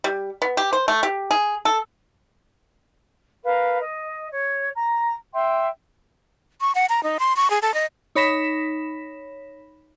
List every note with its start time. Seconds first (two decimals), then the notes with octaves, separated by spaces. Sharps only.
0.04 G3
0.42 B3
0.57 G4
0.73 C5
0.88 A3
1.03 G4
1.31 G#4
1.65 A4
3.44 A#4 B4 F5
3.80 D#5
4.30 C#5
4.76 A#5
5.33 E5 G5 C6
6.61 C#6
6.75 F#5
6.89 A#5
7.03 D#4
7.20 C6
7.36 C#6
7.50 G#4
7.62 A4
7.74 D#5
8.15 D#4 C#5 B5 A#6 B6 E7